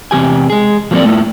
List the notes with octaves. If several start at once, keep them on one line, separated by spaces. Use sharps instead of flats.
E2 C3 E3 G4 G#5
G#3 G#4
F3 F#3 A#3 C4 A4 D5
A3 E4 F4